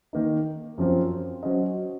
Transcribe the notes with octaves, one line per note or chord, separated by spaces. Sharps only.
D#3 A#3 D#4
F#2 F3 C4 F4 C5
F#3 C#4 F#4 C5 D#5